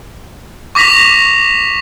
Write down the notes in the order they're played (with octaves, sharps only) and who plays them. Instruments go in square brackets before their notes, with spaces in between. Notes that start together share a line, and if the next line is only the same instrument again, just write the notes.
[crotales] C#6 D6 A#6 B6 F7